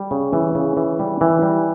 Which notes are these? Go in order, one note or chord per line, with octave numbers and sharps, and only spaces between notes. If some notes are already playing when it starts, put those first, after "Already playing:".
Already playing: G3
C#3
E3
C#3
E3
G3
E3
G3